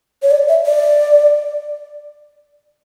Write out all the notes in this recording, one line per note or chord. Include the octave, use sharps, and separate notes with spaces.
C#5
D5
E5
D5